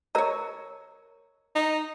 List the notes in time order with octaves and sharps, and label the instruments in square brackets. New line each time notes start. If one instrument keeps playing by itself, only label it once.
[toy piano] A#4 A#5 [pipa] C#5 D#5
[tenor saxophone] D#4